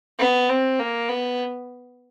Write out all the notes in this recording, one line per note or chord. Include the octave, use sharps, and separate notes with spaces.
B3
C4
A#3
B3